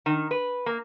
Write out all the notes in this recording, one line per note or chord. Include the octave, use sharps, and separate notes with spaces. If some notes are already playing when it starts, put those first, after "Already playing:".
D#3
B4
A#3